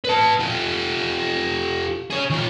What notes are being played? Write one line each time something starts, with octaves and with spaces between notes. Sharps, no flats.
B4 A5
F4 G4
G#4 C#5
D#3 F4